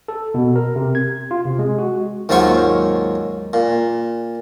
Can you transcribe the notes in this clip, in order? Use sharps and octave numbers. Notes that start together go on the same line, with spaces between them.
A4
B2
A#4
C3
G#6
F4
C3
G#3
F#4
D#2 G#2 F#3 F4 C5 C#6
A#2